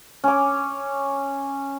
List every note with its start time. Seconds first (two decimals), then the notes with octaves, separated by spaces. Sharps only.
0.24 C#4 D6